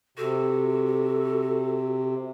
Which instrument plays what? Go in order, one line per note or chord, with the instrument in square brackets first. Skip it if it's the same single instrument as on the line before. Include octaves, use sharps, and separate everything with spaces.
[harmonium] C3 [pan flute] F#4 [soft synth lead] A4